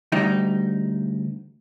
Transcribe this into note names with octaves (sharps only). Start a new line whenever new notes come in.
D2 G3 D#4